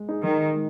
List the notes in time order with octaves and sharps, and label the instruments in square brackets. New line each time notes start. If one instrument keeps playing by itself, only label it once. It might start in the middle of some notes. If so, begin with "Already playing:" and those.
Already playing: [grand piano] G#3
D#4 G#4
[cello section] D#3
[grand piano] G#3